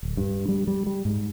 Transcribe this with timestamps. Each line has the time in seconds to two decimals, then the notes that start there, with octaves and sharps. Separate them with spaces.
0.03 D1
0.17 G2
0.48 G3
0.67 G3
0.87 G3
1.05 G#2